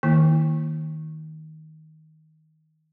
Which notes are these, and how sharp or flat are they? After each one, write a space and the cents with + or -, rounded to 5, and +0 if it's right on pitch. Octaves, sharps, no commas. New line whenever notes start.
D#3 +15 A#3 +0 E4 +0